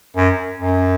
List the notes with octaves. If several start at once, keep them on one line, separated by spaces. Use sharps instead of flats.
F#2
F#2